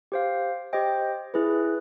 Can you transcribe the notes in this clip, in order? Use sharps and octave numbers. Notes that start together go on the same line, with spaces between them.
G4 C5 F5
G4 C5 D#5 G5
E4 G#4 B4